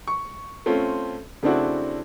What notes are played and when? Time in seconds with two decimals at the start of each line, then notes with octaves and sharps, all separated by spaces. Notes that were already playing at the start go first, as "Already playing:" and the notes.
0.07 C#6
0.66 A3 C4 C#4 F4
1.43 C#3 A3 C4 D4 E4 F#4